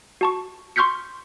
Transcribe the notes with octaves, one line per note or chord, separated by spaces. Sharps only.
F#4 A5 C#6
C6 C#6 F6 G6 B6 C#7